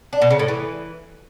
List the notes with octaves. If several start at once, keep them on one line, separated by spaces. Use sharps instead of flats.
D4
B2
C#3
A2
E3